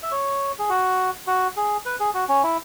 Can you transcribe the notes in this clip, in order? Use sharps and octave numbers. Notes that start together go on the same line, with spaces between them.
E5
C#5
G#4
F#4
F#4
G#4
B4
G#4
F#4
C#4
E4